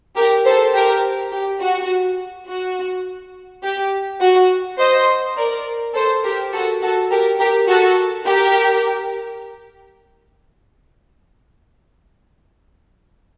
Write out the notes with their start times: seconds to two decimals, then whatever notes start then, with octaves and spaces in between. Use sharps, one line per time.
0.15 G4 A#4
0.45 A4 C5
0.73 G4 A#4
1.31 G4
1.60 F#4
2.48 F#4
3.63 G4
4.21 F#4
4.79 C5 D#5
5.36 A#4 D5
5.94 A4 C5
6.23 G4 A#4
6.52 F#4 A4
6.81 F#4 A4
7.11 G4 A#4
7.39 G4 A#4
7.68 F#4 A4
8.25 G4 A#4